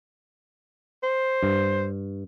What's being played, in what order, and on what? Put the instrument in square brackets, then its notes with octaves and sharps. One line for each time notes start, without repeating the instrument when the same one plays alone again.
[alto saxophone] C5
[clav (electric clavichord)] G2